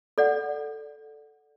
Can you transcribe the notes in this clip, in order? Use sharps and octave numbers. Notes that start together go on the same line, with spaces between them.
A4 D5 F#5